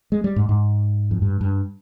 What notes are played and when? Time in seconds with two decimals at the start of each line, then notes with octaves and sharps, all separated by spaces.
0.12 G#3
0.24 G3
0.36 G#2
0.49 G#2
1.11 F2
1.22 G2
1.41 G2